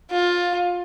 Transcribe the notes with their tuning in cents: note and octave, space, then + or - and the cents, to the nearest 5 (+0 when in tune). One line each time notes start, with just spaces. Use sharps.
F4 +15